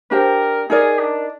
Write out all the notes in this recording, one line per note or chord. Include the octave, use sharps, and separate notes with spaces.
D4 G4 A#4 C5 G5
D#4 G#4 A#4 D5
D4